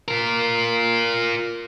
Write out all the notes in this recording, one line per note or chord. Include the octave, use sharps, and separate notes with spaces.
F4 A#4